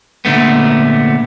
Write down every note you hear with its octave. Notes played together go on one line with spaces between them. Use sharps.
A#2 D3 A3 B3